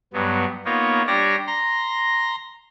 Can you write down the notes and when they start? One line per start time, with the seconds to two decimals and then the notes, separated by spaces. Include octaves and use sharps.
0.13 G2 F#3 B3
0.65 A#3 B3 D#4 F4 C#5
1.07 G3 D4 C#5 D5 A#6
1.47 A#5 C6 A#6